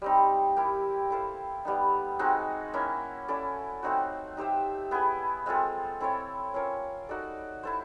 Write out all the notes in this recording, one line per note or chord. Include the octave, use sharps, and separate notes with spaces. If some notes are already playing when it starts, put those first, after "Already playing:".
G3 C4 D#4
E4 G4 A#4
E4 A4 C5 F5
G3 B3 D#4
G#3 C4 D#4 F#4
A#3 C#4 E4
C#4 E4 A4 D5
A3 C4 D#4 F#4
D#4 G4 C5 E5
B3 E4 G#4
G#3 C4 F4 A4
C4 E4 A4 C#5
C#4 F4 A#4 C#5
D#4 F#4 A4 D5
E4 A4 C5